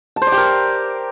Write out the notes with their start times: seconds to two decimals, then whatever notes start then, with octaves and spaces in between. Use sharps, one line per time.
0.16 A5
0.22 C5
0.27 D5
0.32 G4
0.38 A#4